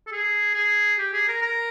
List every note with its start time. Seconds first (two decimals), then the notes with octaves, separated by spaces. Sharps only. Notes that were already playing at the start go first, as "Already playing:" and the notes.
0.07 A4
0.12 G#4
0.54 G#4
0.99 G4
1.13 G#4
1.28 A#4
1.42 A#4